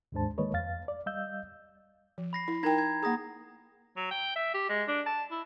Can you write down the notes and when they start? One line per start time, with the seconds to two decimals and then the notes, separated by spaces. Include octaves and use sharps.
0.12 D#2 G#2 G#3 D4 C5 A5
0.38 D#3 G#3 A#3 B4 C#5 D#5
0.53 F2 F5 A6
0.88 D5
1.06 G3 D#5 F5 E6 G6
2.18 F3
2.33 B5 A#6 C7
2.48 E4
2.63 D#4 A#4 G5 A#5 G#6 A#6
2.78 G#6
3.03 A#3 G#4 A#5 D#6 A#6
3.96 F#3
4.11 G5
4.36 E5
4.54 G4
4.69 G#3
4.88 D4
5.06 A5
5.31 E4